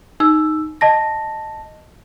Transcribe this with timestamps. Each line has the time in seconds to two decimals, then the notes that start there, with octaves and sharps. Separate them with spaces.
0.20 D#4 E6
0.81 D#5 A5 A#6